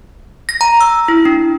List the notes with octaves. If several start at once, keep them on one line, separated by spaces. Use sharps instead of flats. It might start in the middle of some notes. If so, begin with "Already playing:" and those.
A#6
A#5
E6
E4
D4